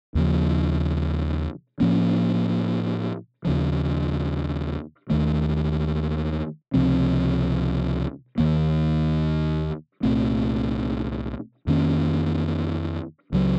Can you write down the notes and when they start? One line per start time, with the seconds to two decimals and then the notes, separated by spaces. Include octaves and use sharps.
0.15 D#2 C#3 F3
1.80 A2 F3 A#3 C#4
3.45 D#2 C#3 F3
5.10 D#2 D#3 A3
6.74 C#2 C3 F3 C4
8.38 D#2 D#3 A#3
10.03 C2 A#2 A3 C4
11.67 F2 D#3 A#3 C#4
13.32 C#2 C#3 F#3